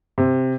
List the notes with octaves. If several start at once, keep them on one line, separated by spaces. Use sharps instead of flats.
C3